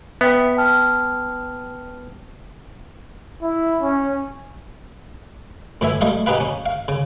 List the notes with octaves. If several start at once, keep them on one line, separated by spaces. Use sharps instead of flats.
B3 E5 G5 B6
G5 A5 F6
E4
C#4
A2 E3 E5 G#5
G3 A3 D#5 F5
D#4 G4 G#4 B4 F5
C#4
F5
C#3